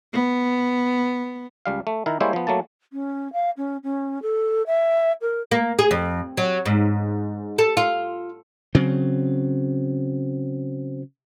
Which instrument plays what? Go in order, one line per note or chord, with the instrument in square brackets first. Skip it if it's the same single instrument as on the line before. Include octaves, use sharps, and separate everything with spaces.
[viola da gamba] B3
[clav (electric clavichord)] C#2 G3 F5
A3
D#3 E4 A#4
G3 G#3 A#3 E4 C5 C#5
F3 B3
F#3 A3 A#3 A5
[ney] C#4
F5
C#4
C#4
A4
E5
A#4
[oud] A#3
G#4
F2
F#3
G#2
A4
F4
[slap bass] C#3 F#3 C4